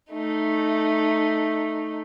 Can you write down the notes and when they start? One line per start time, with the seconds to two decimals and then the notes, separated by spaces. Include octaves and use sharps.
0.11 A3 D#4